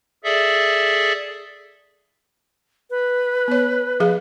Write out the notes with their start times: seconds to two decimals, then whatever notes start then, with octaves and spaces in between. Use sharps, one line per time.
0.24 G#4 A4 D5 E5
2.90 B4
3.48 B3 C#5
4.00 F3 G#4 F5